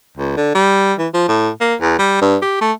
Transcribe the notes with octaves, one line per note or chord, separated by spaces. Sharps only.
C#2
D3
G3
E3
F3
A2
A#3
E2
G3
G2
G4
A3